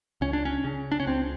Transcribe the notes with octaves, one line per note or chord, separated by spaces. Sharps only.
C#2 C#4
D4
C#4
C#3
D4
C#4
C#2 C4